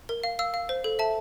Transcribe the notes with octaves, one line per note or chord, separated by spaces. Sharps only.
A#4
F5
F5 E6
F5
C5
A4
E5 A5